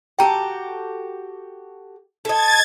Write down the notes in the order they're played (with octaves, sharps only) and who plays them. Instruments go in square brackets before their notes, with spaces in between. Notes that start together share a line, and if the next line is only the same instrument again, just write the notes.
[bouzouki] F#4 G4 A4 [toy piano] G5 A#5
[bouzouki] A4 D#5 [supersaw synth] G#6 A6